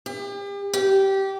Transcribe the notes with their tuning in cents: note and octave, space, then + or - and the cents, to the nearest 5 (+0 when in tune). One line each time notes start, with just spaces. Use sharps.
G4 +40
G4 -15